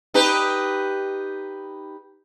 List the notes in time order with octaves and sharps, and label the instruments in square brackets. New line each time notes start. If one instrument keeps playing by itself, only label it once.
[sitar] D#4 G4 B4